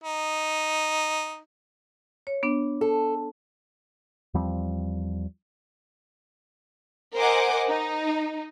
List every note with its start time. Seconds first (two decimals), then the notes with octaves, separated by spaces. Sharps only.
0.04 D#4
2.27 C#5
2.43 B3 D4
2.81 A4
4.34 E2 F3 G3 C4
7.17 A#4 C5 D#5 F#5 G#5 D6
7.68 D#4